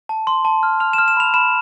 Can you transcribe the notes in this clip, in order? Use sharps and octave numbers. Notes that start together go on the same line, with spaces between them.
A5
C6
A5
F6
F6 F7
E7
F6
E7
B5 F7
B5 E7